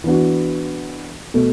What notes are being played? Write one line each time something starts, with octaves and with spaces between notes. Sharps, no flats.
E3 B3 D4 F#4
B2 A3